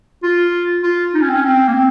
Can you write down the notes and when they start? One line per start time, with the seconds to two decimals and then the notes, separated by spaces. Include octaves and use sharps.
0.23 F4
0.83 F4
1.14 D#4
1.21 C#4
1.29 C4
1.35 C#4
1.44 C4
1.68 A#3
1.74 C4